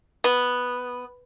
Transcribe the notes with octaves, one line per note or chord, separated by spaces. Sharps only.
B3